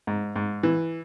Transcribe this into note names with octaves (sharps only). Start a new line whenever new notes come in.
G#2
G#2
E3